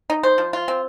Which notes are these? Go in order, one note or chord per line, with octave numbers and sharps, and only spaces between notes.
D#4
C5
F3
F4
C4